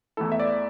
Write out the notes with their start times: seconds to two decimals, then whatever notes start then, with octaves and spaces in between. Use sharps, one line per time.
0.17 E2 E3 A3 E4 A4
0.32 E5
0.40 D5